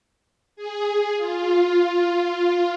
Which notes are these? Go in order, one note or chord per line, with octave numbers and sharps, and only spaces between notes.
G#4
F4